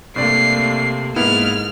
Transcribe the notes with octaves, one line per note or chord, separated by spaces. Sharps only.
G2 C3 A3 A#3 D5 C7
G#2 A#3 B3 E4 F6